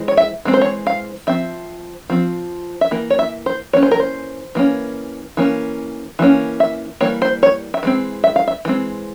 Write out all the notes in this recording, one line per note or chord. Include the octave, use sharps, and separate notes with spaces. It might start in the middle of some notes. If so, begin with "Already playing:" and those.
Already playing: E3 G#3 C4
C#5
E5
E3 G#3 C4
C5
C#5
F5
F3 C4 E5
F3 C4
E5
E3 A#3
C#5
E5
C5
E3 A#3 C#4 C#5
C5
A#4
C5
E3 A#3 C#4
E3 A#3 C#4
E3 G3 A#3 C#4
E5
E3 G3 A#3 C#5
C5
C#5
E5
E3 G#3 C4
E5
F5
E5
E3 G#3 C4